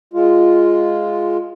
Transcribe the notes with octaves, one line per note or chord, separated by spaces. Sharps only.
G#3 F4